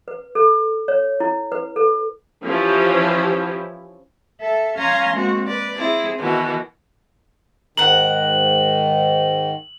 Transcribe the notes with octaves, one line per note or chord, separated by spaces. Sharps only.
B4
A4
C#5
E4
B4
A4
E3 F3 C#4 E4 G4
A4 E5
C#4 F5 G#5 A#5 C6 A#6
G#3 A#3 C4 F#4
B4 D5
C4 E4 G#4
B2 D#3 E3 F#4
G#2 D#3 A#4 F#5 F#7